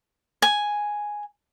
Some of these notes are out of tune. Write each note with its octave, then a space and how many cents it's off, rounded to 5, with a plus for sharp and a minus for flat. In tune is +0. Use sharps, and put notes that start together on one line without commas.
G#5 +0